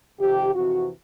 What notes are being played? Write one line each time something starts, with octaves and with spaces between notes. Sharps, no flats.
F2 C3 D#3 G4
F2 C3 E3 F#4